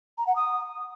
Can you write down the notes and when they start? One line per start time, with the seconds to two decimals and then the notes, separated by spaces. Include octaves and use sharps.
0.18 A#5
0.27 F#5
0.36 D#6